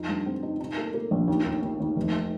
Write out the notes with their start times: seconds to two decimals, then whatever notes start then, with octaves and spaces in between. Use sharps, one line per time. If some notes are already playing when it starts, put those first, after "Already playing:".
Already playing: F2 D#4
0.09 G2
0.26 C4
0.43 D#4
0.60 D#4
0.77 A#3
0.94 A#3
1.11 A#1
1.28 D#2
1.45 D#2
1.62 D#2
1.80 D#2
1.96 F1